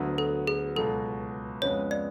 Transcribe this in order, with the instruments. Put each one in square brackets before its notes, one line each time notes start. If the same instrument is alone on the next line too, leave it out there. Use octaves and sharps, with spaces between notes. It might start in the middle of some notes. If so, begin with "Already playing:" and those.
Already playing: [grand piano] D2 D3 F#3 B3
[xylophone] A4
G#4
[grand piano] C#2 B2 F#3 [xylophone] A4
[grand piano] F2 C#3 G#3 B3 [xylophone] C#5
[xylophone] D5